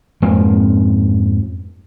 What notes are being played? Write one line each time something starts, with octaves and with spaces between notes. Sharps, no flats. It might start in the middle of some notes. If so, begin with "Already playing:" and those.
F2 G#2 F3 A#3